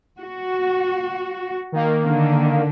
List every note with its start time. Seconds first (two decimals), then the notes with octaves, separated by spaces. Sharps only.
0.19 F#4
1.72 D#3 A#3
2.06 D3